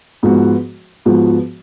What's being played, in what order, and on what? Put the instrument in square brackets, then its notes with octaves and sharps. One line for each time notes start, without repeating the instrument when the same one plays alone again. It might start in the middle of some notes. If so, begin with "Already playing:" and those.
[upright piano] G#2 F3 B3 F#4
G#2 F3 B3 F#4